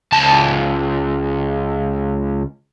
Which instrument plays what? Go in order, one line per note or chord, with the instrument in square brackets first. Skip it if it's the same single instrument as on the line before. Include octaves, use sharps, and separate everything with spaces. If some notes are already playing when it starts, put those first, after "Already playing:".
[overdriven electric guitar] C#2 A5